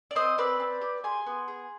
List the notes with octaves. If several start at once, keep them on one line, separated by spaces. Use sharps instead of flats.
D5
C4 C5 D#5
C4 B4 D5
C4
G4
G#4 G#5 C6
B3
G#4